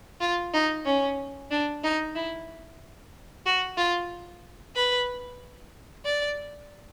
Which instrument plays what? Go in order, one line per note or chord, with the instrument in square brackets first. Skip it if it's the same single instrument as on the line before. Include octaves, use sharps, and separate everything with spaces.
[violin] F4
D#4
C#4
D4
D#4
E4
F#4
F4
B4
D5